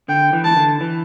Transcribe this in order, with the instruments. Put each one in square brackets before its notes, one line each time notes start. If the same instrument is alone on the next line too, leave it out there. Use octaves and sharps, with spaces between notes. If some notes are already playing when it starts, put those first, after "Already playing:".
[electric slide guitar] D3 [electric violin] G5
[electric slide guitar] E3
[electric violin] A5
[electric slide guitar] D3
E3